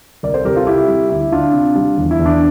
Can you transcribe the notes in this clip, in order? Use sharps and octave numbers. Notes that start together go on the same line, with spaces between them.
C2 A#4 D5
A4 C5
C2 G4 A#4
F4 A4
C3 E4 G4
G3
D2 E4
D2 D4 F4
C3
G3
E2
E4
E2
D4